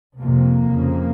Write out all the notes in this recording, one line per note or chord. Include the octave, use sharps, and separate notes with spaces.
F2 C3 A#3
F2 C#3